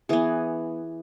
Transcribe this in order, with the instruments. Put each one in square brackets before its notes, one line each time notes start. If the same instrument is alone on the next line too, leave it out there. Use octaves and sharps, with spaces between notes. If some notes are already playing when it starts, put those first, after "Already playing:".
[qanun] E3 B3 G#4